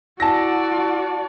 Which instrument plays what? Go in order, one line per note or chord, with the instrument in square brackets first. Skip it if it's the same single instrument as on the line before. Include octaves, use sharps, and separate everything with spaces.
[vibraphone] E4 [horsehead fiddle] F#4 D5 [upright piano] A5 A#6